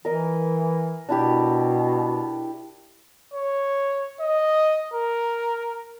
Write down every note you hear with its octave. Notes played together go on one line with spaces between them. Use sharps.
E3 A#4 D#5
B2 D4 E4 G4
C#5
D#5
A#4